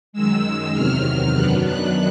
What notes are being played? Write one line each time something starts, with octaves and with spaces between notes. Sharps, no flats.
F#2 D#3 G#3 E6
E2 C3 D#3 F#3 F6
F#2 D#3 F#3 B3 D4 F#6
F#6